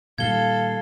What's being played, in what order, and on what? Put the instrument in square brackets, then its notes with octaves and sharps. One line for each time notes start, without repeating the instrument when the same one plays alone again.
[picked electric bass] A#2 D#3 G3 [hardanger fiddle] A4 [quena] F5 [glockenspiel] G#6 G7